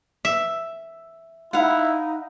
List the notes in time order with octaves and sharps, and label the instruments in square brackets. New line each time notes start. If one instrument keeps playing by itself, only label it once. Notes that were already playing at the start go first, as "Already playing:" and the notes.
[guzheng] E5
[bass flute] D#4 [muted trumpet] E4 [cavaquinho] F5 F#5